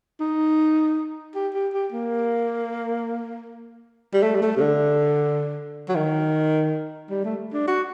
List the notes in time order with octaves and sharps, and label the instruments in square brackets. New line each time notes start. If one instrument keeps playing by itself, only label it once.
[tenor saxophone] D#4
G4
G4
G4
A#3
G3
A3
G3
A3
C3
D3
F#3
D#3
G3
A3
D4
F#4